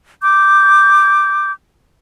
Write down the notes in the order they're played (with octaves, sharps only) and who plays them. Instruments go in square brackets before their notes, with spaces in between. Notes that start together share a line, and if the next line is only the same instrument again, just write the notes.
[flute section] D6 G6